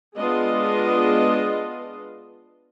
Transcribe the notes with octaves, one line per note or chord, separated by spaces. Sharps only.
G#3 B3 D4 F4 D#5